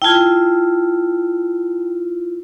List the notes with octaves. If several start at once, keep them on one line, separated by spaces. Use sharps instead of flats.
E4 F4 G5 A5 G#6